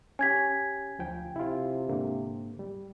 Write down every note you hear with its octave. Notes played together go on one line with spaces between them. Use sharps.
C#4 G4 G#5 G#6 B6
D2 F3 G5
C3 E4 F4
G#2 D3 A#3
G3